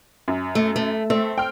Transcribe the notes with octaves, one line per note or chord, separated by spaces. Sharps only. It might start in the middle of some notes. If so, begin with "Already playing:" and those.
F#2
A3
A3
A3 C4
G5 F6